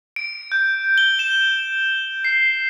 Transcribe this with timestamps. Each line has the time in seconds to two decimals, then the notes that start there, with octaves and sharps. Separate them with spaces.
0.16 D7
0.52 G6
0.98 G7
1.19 E7
2.24 C7